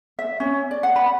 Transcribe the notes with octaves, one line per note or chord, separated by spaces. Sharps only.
E5
C#4
D5
F#5
B5